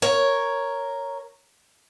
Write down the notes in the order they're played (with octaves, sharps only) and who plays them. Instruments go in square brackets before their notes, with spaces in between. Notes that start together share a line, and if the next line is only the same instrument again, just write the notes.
[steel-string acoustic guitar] A#4 C#5